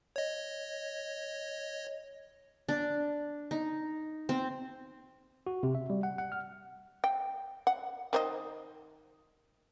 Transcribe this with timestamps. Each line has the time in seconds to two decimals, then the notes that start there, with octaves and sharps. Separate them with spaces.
0.16 C#5 D#5
2.69 D4
3.51 D#4
4.29 C4
5.47 F#4
5.63 C3
5.75 E5
5.90 G3
6.03 F#5
6.18 F#5
6.32 F6
7.04 G5
7.67 F#5
8.13 D#3 C5 D#5